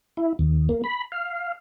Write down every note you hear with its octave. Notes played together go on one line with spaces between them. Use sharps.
E4
D#2
A#3
B5
F5